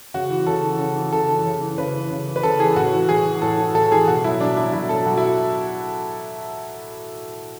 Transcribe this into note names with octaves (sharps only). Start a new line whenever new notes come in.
C#3 F#4
E3
C#3 A4
E3
C#3
E3
C#3 A4
E3
C#3
E3
C#3 B4
E3
C#3
E3
B4
C#3 A4
E3 G#4
A2 F#4
E3
A2 G#4
E3
A2 A4
E3
A2 A4
E3 G#4
B2 F#4
F#3 E4
B2 D4
F#3 E4
B2 E4
F#3 A4
B2 F#4
E4